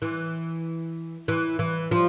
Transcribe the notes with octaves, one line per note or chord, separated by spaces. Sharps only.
E3
E3
E3
F3